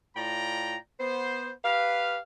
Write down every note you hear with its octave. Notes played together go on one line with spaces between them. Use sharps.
A2 F4 D5 G5 A#5
B3 C5
G4 B4 F5